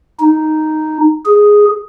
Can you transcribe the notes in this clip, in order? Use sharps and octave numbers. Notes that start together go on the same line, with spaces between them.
D#4
G#4